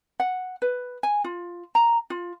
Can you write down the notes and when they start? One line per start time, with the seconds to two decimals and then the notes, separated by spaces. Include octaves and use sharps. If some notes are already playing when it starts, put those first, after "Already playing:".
0.20 F#5
0.62 B4
1.03 G#5
1.24 F4
1.75 A#5
2.10 F4